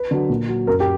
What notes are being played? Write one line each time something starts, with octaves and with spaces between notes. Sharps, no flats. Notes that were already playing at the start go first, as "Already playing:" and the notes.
Already playing: B4
D3 F#3
A#2
F#3
F#2 A#4
G4